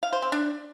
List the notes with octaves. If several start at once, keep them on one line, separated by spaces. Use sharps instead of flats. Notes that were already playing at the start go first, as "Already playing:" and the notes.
F5
C5
C4
D4